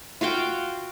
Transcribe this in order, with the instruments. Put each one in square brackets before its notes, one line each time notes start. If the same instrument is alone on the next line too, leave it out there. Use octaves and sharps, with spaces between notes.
[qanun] F4 F#4 F5 G5